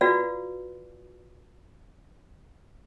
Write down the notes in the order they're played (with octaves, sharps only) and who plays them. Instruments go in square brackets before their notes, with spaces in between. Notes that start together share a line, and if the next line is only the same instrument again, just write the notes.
[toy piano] F4 F#4 B4 D5 F5